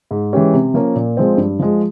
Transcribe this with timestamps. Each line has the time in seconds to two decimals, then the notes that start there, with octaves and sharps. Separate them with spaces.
0.11 G#2
0.33 E3 G#3 C#4 G4
0.53 C3
0.74 F3 A#3 C#4
0.96 A#2
1.17 F3 G#3 C4
1.37 G2
1.59 F3 G#3